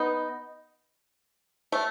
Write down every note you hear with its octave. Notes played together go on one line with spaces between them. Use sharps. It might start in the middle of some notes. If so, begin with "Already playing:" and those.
Already playing: B3 D#4
A3